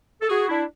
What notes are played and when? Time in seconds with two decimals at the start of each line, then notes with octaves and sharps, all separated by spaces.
0.22 A4
0.29 F#4 G#4
0.48 D4 E4